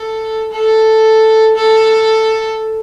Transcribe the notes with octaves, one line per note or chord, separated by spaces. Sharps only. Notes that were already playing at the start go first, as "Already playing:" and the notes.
Already playing: A4
A4
A4